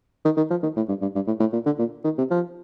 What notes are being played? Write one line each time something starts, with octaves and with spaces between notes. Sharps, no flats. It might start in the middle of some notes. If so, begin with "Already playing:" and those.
D#3
D#3
F3
D#3
A2
G2
G2
G2
A2
A2
A#2
D3
A#2
D#3
C3
F3